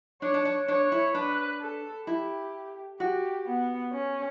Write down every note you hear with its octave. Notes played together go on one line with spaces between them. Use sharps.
D4 C#5
D4
D4
D4 C#5
E4
D4 B4
A4
E4 G4
F#4 G4
B3
C#4